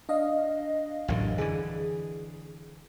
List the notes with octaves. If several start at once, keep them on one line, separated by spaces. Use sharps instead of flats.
D4 D#5 F5
A1 F#2 D3
D3 E3 G#4